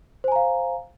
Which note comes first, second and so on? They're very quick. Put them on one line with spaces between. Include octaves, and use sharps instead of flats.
C5 G#5 A#5 F5